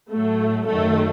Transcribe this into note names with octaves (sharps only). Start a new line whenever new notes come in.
A2 F#3 A3
F#2 D#3 F#3 A3